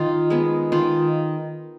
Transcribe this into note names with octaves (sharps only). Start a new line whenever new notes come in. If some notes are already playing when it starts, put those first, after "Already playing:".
Already playing: D#3 F4
G#3 B3
D#3 F4